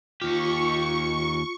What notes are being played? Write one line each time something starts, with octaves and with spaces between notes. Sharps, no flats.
D#2 F4 G4 C#6